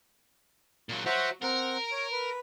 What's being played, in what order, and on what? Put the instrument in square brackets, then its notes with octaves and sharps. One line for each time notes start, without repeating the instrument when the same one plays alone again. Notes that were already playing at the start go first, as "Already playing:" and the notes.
[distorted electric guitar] A#2 F#3
[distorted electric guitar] F#4 C#5 [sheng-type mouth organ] C5 E5 F#5
[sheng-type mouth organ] C4 F#5 [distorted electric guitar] A#4
[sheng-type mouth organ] C#5
B4